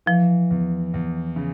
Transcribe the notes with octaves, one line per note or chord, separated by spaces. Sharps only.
E3 F3
E2
E2
C#3